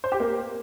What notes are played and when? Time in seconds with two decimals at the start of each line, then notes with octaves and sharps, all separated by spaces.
0.04 C5
0.12 G4
0.20 A#3